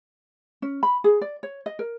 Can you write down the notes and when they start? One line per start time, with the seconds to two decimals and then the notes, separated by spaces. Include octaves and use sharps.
0.62 C#4
0.83 B5
1.04 G#4
1.21 D5
1.43 C#5
1.66 D#5
1.79 A#4